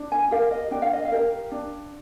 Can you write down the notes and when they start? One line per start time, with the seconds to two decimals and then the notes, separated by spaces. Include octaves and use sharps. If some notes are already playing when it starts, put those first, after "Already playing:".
Already playing: D4
0.12 G#5
0.31 G4 A#4 F5
0.51 D#5
0.71 D4 G5
0.82 F5
0.93 D#5
1.05 F5
1.12 G4 A#4
1.52 D4